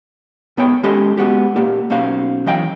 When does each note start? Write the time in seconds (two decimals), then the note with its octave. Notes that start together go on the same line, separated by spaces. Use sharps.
0.57 G#2 B3 C#5 G5
0.83 G#3 C#4 G4 A4 D#5 C6
1.17 G#3 B3 F#4 G4
1.56 A#2 A#3 G4
1.90 B1 A#3 C#4 C5 F5
2.46 E3 F#3 D#5 F5 G5